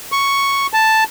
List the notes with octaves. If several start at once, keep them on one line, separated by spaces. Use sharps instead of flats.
C#6
A5